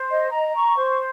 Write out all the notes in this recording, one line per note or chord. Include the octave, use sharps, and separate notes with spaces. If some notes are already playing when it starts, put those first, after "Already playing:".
Already playing: C5
D#5
A#5
C#6
C5